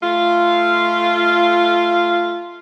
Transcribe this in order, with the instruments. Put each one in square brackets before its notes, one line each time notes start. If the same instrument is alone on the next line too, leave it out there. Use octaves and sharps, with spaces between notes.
[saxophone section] A3 F4